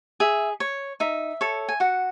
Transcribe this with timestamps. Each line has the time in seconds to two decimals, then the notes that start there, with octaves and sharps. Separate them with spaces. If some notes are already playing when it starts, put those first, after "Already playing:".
0.20 G#4 E5
0.60 C#5
1.00 D#4 E5
1.41 A4 C#5
1.69 G#5
1.80 F#4 F#5